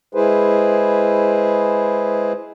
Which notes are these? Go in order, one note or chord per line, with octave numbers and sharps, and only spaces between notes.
G#3 E4 G#4 B4 C5